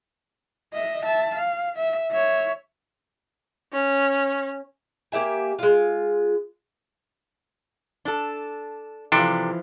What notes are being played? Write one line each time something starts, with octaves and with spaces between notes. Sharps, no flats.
D#5 E5
E5 A5
F5
E5
C#5 E5
C#4
A#3 G4 E5 G#5
G#3 F4
D4 A4
C3 E3 F3 D4 A4